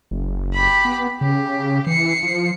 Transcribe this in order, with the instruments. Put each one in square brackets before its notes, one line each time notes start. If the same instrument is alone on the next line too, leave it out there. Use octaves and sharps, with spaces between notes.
[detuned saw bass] F#1
[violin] G4 B5
[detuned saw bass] B3
[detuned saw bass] C#3 [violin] G4
[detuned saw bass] E3 [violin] C7 C#7
[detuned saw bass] F3